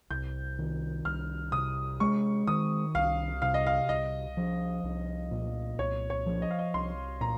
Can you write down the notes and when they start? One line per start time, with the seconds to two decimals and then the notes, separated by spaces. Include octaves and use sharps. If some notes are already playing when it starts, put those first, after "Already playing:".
0.10 C2 G6
0.59 D#3
1.05 C2 F6
1.52 C3 D#6
2.00 G#3 C#6
2.47 D#3 D#6
2.95 C2 F5
3.42 C3 F5
3.54 D#5
3.67 F5
3.89 C2 D#5
4.37 F3
4.84 C2
5.31 A#2
5.79 C2 C#5
6.10 C#5
6.26 F3
6.42 D#5
6.51 F5
6.59 D#5
6.74 C2 C6
7.21 A#2 A#5